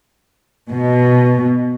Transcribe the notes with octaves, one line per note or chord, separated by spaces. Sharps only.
B2